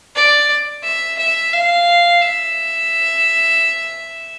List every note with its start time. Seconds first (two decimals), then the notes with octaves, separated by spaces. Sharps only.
0.16 D5
0.84 E5
1.19 E5
1.53 F5
2.21 E5